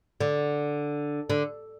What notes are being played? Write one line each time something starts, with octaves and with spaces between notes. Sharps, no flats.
D3
D3